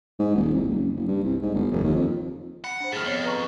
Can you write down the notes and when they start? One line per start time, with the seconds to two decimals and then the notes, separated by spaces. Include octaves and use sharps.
0.19 G#2
0.35 D#1
0.53 C2
0.68 F#1
0.96 F#1
1.08 G2
1.23 C2
1.42 G#2
1.54 G1
1.71 F1
1.83 D#2
1.96 F2
2.64 F#5 B5
2.80 D4 C5
2.93 A2 D#3 G#4 F6 A6
3.05 F2 B3 C#5
3.25 B4 A#5 C#6